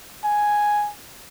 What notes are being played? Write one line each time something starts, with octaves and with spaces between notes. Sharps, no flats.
G#5